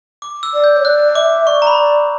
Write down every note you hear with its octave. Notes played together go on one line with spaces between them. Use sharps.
D6
E6
D5
G6
C#5
D5 F#6
E5 D6
D5 C#6
A#5
B5